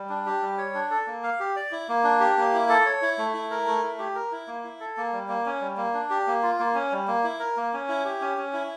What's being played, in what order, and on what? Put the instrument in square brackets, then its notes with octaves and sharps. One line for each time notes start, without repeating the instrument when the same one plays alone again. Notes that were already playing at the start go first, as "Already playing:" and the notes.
Already playing: [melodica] G3
D4
G4
G3
C#5
D4
A4
A#3
F5
G4
D5
E4
A#3
D4
G4
A#3
E4
A4
C#5
E4
A3
E4
A#4
A3
E4
G4
A#4
E4
A#3
E4
A4
A#3
G3
A#3
C#4
G3
A#3
D4
G4
A#3
F4
A#3
C#4
G3
A#3
E4
A#4
A#3
C#4
E4
G4
C#4
C#4
E4